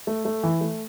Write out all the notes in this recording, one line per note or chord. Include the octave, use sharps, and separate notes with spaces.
A3
A3
E3
A3